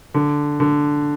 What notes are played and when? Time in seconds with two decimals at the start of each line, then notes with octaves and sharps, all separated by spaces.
0.14 D3
0.60 D3